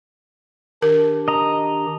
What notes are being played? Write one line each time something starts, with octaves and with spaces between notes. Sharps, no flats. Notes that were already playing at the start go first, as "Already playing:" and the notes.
D#3 D4 G4 A#4
D#5 A#5